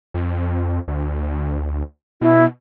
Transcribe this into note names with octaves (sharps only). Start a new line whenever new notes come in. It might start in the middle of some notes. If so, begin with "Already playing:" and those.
F2
D2
B2 E4